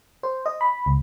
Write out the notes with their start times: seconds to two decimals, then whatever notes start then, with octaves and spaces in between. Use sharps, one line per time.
0.23 C5
0.46 D#5
0.61 B5
0.86 C#2